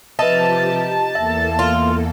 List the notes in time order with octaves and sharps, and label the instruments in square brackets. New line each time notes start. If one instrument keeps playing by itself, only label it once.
[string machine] C3 F3 G4 [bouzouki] D#4 [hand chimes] B4 E5 [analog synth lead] A5
[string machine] E2 A#3 A4 [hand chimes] E5
[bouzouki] F4